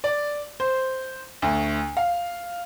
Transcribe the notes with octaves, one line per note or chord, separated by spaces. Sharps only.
D5
C5
D2
F5